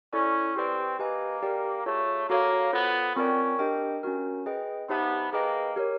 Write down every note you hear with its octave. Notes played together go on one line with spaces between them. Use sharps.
C#4 E4 A4 D5
C4 G4 B4 D5 G5
A#3 G4 B4 D#5 G#5
G4 A#4 D5 G5
A3 F4 G#4 C#5
A#3 F#4 A4 C#5 F5
B3 F4 A4 C5
C4 C#4 F4 A#4 D5 G5
D4 G4 A#4 D#5 G5
C#4 F#4 A#4
G#4 B4 D#5 G5
B3 D#4 G4 C5 E5 A5
A#3 G#4 B4 D#5 G5
G4 A#4 C#5